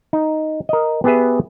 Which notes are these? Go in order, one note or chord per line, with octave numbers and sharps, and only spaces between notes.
D#4
A#4 D#5
B3 G4 G#4 B4 E5